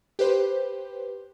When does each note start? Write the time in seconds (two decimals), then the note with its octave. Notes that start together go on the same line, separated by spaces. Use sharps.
0.19 G4 B4 C5